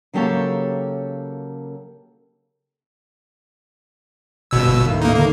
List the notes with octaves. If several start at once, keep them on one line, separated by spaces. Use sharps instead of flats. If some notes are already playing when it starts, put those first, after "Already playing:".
C#3 F#3 A#3 G4 A4 C#5
G1 B2 E6 G6 G#6
D#2 A2
A#3 D#4
A2 D3 D#3 A#3